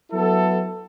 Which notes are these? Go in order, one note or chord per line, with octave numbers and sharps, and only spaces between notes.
F#3 B3 E4 A4